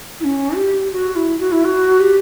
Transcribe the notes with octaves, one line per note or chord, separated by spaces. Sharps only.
E4
C#4
G4
F#4
E4
F#4
E4
F#4
G4